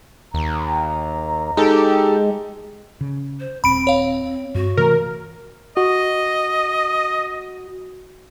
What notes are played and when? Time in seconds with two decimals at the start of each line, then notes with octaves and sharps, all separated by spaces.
0.34 D#2 A#5
1.57 G#3 D#4 G4 A4
3.01 C#3
3.40 C5
3.64 D#1 C4 B5 D7
3.87 C#5 F5
4.55 G2 F#4
4.77 C3 E3 A3 A#4
5.77 F#4 D#5